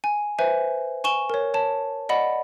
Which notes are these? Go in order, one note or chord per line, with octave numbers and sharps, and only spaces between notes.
G#5
B4 C5 E5 G#5
G#5 C#6 E7 G7
A#4 C#5
C#5 A5
D5 D#5 F#5 B5